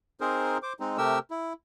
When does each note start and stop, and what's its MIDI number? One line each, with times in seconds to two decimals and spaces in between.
0.21 0.58 60
0.21 0.58 63
0.21 0.58 68
0.21 0.58 70
0.21 0.58 72
0.63 0.73 72
0.63 0.73 86
0.80 0.97 56
0.80 0.97 60
0.80 0.97 63
0.98 1.19 48
0.98 1.19 57
0.98 1.19 67
0.98 1.19 70
0.98 1.19 88
1.31 1.53 64